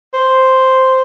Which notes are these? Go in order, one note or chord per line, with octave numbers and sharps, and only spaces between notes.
C5